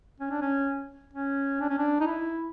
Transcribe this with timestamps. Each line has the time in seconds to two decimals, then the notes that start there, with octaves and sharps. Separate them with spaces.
0.20 C#4
0.31 D4
0.42 C#4
1.13 C#4
1.61 D4
1.69 C#4
1.78 D4
2.01 D#4
2.07 E4